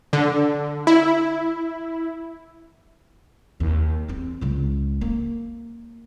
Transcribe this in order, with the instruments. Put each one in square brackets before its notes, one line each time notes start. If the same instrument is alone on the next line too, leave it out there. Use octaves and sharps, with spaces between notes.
[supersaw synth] D3
E4
[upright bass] D#2
E2 C4
C#2 G#3
A#3